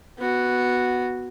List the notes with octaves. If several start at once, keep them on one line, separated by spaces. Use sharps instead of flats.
B3 F#4